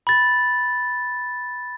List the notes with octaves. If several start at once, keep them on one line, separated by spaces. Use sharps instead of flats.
B5 A6